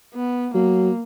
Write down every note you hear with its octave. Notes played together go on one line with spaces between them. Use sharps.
B3
F#3 A#3